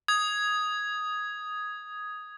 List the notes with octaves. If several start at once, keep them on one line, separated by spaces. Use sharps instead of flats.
D#6 G#6